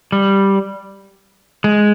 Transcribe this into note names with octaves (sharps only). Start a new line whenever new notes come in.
G3
G#3